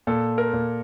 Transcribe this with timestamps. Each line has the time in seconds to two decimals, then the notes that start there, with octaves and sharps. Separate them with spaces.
0.07 A#2 A4
0.38 A#4
0.53 A#2